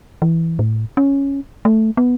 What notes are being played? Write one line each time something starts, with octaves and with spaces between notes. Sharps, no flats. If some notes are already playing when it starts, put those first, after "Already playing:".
E3
A2
C#4
A3
B3